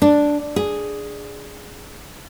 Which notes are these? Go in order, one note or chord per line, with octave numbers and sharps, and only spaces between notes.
D4
G#4